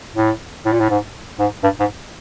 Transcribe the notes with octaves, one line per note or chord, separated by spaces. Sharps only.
A2
A2
A#2
A2
G#2
G#2
G2
G#2